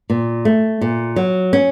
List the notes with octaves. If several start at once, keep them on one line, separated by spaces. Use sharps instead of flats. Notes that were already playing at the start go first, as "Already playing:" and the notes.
A#2
A3
A#2
F#3
C#4